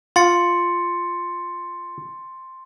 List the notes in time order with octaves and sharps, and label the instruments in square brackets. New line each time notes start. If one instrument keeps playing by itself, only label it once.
[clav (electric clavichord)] F4 [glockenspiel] C6 A6 C#7